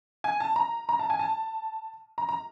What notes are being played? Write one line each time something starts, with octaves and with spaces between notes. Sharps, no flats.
G#5
A5
A#5
A#5
A5
G#5
A5
A#5
A#5